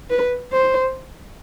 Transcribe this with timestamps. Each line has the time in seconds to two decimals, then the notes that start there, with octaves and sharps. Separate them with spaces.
0.10 B4
0.52 C5